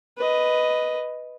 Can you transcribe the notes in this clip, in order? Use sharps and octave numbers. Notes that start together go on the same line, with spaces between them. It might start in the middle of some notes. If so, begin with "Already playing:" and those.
B4 D#5